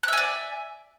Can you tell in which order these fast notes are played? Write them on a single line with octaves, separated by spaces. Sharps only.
F#6 E5 G#5 D5